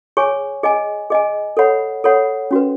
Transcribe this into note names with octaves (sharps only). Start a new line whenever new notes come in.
G#4 C#5 G#5 C#6
G#4 D#5 G#5
G#4 D#5 G#5
A4 C#5 F#5 B5
A4 C#5 F#5 B5
C#4 F#4 B4